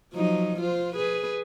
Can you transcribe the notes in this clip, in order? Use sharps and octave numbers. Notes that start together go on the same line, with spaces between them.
F3 F#3 D#4
F4 C5
G#4 B4